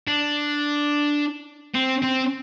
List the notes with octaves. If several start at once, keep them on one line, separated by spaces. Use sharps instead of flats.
D4
C4
C4